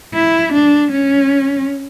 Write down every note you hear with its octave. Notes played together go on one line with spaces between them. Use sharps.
E4
D4
C#4